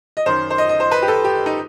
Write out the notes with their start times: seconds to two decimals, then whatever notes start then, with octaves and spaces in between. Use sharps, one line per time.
0.17 D#5
0.26 F#2 D#3 C5
0.50 C5
0.58 D#5
0.69 D#5
0.80 C5
0.91 B4
1.02 G4
1.08 A4
1.24 G4
1.46 D#4